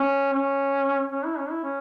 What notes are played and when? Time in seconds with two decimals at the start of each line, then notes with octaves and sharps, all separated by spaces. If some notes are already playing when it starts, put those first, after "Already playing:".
Already playing: C#4
0.33 C#4
1.12 C#4
1.25 E4
1.38 C#4
1.50 E4
1.64 C#4